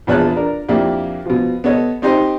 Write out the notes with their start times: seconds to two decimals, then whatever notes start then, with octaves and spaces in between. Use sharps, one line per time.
0.07 A#1 E2 C#5 A5 F#6
0.36 D4 A#4
0.69 F2 A#3 D4 E4 G4
1.26 B2 F3
1.64 B3 A4 C#5 D#5
2.02 C4 D#4 G4 C5 D#5